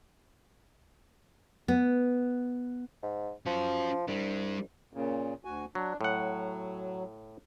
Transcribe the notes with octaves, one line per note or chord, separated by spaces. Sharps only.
B3
G#2
F3 C#4 F#4
C2 G3 D4
A#2 C#3
D2 F#4 G#5
F#3 D4
A2 F#3 F#5